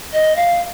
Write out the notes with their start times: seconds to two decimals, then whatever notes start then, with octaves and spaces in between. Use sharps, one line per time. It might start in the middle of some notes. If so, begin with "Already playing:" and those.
0.13 D#5
0.36 F5